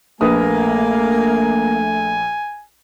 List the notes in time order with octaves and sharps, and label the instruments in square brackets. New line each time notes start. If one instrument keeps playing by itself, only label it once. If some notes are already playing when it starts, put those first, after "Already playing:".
[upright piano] A#1 B4 D#6 [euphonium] A3 [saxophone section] A#3 [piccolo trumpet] G#5